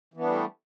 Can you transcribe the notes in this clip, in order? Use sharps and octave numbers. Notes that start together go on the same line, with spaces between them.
E3 G3 A3 B3 D4